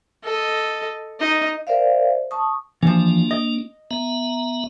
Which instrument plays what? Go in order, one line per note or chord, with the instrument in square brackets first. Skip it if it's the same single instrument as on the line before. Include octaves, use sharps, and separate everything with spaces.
[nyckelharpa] A4 D#5
D#4 D#5
[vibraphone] A#4 C5 D5 E5 F5
A5 C#6 D#6
[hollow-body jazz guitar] E3 F3 [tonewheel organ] A#3 D4
[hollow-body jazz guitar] D#5
[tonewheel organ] B3 E5 A#5